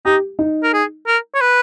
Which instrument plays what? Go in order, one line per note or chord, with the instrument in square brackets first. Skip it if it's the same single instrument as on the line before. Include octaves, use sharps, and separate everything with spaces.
[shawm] D#4 [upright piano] G4
[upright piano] D#4
[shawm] A#4
G#4
A#4
C#5
B4